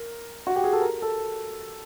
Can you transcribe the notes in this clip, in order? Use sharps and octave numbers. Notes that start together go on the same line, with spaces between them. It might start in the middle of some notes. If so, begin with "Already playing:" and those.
Already playing: A#4
F#4
G4
G#4
A4
A#4
A4